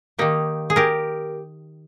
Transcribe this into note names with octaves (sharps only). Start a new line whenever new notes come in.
D#3 A#3 D#4 G4
G#4
G4 A#4